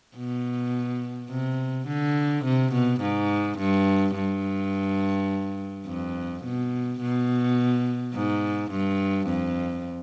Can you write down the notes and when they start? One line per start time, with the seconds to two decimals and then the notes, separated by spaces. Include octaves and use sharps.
0.16 B2
1.30 C3
1.88 D3
2.45 C3
2.73 B2
3.01 G#2
3.59 G2
4.15 G2
5.86 F2
6.44 B2
7.00 B2
8.14 G#2
8.71 G2
9.28 F2